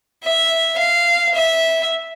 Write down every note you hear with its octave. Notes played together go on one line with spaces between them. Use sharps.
E5
F5
E5